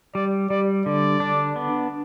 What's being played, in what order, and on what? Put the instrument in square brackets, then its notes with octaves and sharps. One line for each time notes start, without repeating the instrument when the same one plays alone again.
[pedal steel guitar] G3 [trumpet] D5
[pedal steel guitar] G3 [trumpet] D5
[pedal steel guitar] D3 [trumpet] D5
[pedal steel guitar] D4
B3